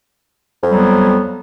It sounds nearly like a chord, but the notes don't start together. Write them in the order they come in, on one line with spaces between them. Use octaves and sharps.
F2 F#3 G3 B3